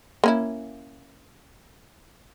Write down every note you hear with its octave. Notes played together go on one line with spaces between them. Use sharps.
A#3 C#4 E4